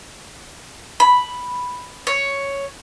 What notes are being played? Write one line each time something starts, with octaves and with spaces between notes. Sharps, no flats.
B5
C#5